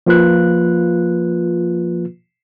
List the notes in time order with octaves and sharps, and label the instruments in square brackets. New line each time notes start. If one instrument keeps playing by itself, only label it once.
[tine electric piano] F3 A#3 F4 B4 F#6